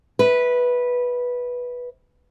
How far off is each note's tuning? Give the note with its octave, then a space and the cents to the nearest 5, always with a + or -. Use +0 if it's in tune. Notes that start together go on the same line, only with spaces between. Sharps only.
B4 -10 E5 -25